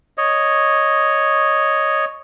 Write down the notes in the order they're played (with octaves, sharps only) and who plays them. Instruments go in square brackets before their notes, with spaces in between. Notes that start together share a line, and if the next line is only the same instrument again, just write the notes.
[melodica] C#5 D#5